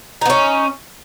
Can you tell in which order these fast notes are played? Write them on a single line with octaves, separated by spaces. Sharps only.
D#4 B3 C#4